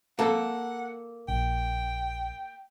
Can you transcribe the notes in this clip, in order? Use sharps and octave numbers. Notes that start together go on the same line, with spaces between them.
A#3 A4 F#5
A#1 G5